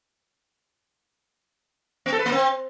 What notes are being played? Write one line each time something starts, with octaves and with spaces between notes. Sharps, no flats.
B3
A4
B4
A#3
C4